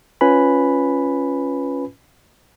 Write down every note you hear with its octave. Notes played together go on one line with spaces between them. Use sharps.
C#4 F4 B4 G#5 B5